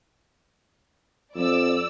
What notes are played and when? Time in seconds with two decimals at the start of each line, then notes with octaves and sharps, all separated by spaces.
1.35 F2 D5 E6